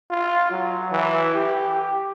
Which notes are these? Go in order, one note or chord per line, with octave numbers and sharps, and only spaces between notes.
F4
F#3
E3
G4